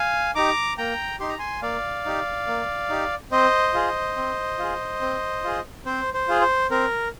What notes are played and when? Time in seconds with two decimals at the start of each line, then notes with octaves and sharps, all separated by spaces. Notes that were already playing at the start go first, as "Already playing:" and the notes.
Already playing: F5 G#5
0.35 D#4 G4 A#5 D6
0.78 A#3 G5 A#5
1.20 D#4 G4 C6
1.29 A#5
1.39 G#5 C6
1.62 A#3 D5 F5
2.05 D#4 G4
2.47 A#3
2.90 D#4 G4
3.32 C4 C5 D#5
3.74 F4 G#4
4.16 C4
4.59 F4 G#4
5.01 C4
5.44 F4 G#4
5.86 C4 C5
6.14 C5
6.28 F4 G#4
6.42 C5
6.71 C4 A#4